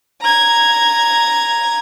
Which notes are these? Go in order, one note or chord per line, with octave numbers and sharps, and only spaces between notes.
A#5 G#6